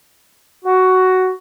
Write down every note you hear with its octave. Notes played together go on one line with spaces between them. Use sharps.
F#4